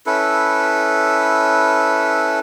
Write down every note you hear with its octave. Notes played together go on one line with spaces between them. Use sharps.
C#4 E4 A4 B4